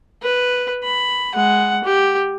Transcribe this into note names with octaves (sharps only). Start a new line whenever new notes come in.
B4
B5
G#3 F#5
G4